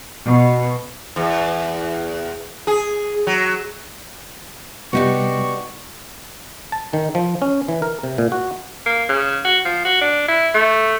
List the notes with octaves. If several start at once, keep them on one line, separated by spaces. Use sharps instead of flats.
B2
E2
G#4
F#3
C3 G3 B3 D4 D#4 F#4 G4 C#6
A5
D#3
F3
C#4
E3
A#4
C3
A#2
F#4
A#3
C#3
F#4
F3
F#4
D4
E4
A3